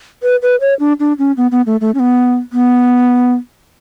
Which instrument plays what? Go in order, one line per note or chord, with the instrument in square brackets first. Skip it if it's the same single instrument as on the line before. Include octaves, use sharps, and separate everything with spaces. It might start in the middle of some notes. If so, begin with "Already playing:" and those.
[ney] B4
B4
C#5
D4
D4
C#4
B3
B3
A3
A3
C#4
B3
B3